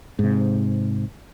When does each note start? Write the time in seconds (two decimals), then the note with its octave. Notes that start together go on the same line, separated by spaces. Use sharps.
0.19 G#2 C3